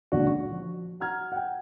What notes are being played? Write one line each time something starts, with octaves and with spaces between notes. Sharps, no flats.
C#2 A#2 D3 D4 F#4
C#6
F3
F#5 A#5 F6 G#6
F#5 G5